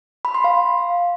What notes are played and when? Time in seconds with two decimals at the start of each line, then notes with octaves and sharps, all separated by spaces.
0.25 B5
0.34 C6
0.44 F5